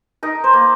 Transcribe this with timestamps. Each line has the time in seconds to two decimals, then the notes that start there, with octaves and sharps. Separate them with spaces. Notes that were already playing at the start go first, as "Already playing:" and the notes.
0.23 D#4 A#4
0.44 C5
0.53 A#3